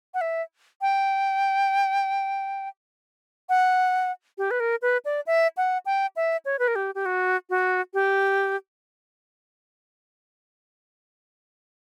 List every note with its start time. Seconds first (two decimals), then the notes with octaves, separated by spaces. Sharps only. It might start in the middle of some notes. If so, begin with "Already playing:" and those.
0.14 F#5
0.21 E5
0.81 G5
3.49 F#5
4.38 G4
4.51 B4
4.60 A#4
4.82 B4
5.05 D5
5.27 E5
5.57 F#5
5.86 G5
6.16 E5
6.45 C#5
6.59 B4
6.68 A#4
6.76 G4
6.95 G4
7.06 F#4
7.50 F#4
7.94 G4